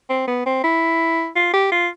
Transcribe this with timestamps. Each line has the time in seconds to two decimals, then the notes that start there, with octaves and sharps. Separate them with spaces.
0.09 C4
0.28 B3
0.46 C4
0.64 E4
1.36 F4
1.53 G4
1.72 F4